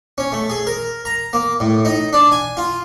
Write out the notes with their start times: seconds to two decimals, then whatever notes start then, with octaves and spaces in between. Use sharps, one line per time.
0.18 C#4
0.32 A3
0.50 G#4
0.67 A#4
1.05 A#5
1.33 A#3
1.60 A2
1.85 D#4
2.13 D4
2.32 G#5
2.57 F4